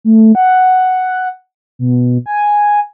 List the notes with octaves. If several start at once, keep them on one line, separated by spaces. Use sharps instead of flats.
A3
F#5
B2
G#5